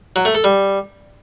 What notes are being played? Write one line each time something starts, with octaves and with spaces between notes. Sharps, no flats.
F#3
A3
A4
G3